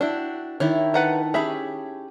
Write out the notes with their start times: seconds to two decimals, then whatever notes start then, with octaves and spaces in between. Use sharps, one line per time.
0.01 D4 E4 F#4 G5
0.60 D#3 D4 E4 C#5
0.94 A4 B4 F#5 A#5
1.34 C#4 G4 G#4 E5 B5